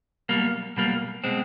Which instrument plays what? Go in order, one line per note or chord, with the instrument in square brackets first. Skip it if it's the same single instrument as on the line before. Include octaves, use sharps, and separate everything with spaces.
[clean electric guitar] B1 B2 G3 A#3
B1 B2 G3 A#3
B2 G#3 C4